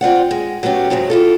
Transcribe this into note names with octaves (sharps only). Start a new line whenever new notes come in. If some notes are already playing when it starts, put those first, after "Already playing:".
C4 F4 D5 F#5
G#3
F#3 A3 B3 C#4 G4
G#2 C#3 F#3 G#3
E4 F4 A4